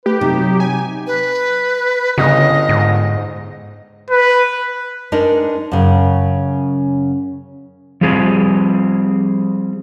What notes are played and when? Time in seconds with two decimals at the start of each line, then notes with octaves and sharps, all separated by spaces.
0.06 A3 G4 B4
0.21 C3 F#3 D#4
0.60 G#5
1.07 B4
2.18 G1 C#3 D#5 D#6
2.69 G#2
4.10 B4
5.12 G#3 D4 D#4 A#4 B4
5.72 F#2 C#3
8.01 F3 G3 C4 G#4